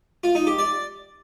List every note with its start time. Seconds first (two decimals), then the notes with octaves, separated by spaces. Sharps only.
0.24 F4
0.35 D#4
0.47 G4
0.58 D5